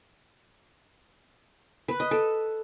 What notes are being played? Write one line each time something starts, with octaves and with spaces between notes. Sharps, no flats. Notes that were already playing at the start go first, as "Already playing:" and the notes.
B4
D#5
A4